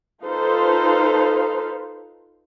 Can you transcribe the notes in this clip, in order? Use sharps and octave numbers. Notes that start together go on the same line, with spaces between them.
D#4 F4 A4 B4 C5 F5